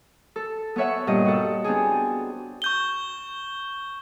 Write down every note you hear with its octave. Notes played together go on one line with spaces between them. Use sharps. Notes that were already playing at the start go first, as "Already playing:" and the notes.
A4
B3 A4 C#5 E5 F#5
G2 A#2 D#5
F#4 A4
B3 C4 D4 G#4
C#6 G6 G7